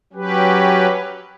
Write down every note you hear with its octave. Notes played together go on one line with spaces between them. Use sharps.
F#3 C#4 G4 B4